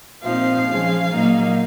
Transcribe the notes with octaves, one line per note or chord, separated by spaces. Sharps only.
A#2 F3 C4 D#4 F5
F3 G#3 C#4
A#2 F#3 A#3 D#4